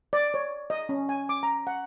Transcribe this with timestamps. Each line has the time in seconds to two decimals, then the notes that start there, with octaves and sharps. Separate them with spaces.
0.13 D5
0.34 C#5
0.70 D#5
0.89 C#4
1.09 G#5
1.29 D6
1.43 A#5
1.67 F#5